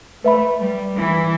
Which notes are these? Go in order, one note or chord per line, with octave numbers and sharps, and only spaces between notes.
A3 B4 E5 B5
G3
E3